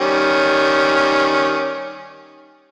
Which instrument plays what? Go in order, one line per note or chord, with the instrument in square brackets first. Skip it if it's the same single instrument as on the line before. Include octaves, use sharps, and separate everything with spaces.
[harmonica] D#3 G3 C#4